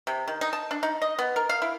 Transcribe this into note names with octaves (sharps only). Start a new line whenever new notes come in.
C3
D#3
D#4
A5
D4
D#4
D#5
B3
A#4
F5
E4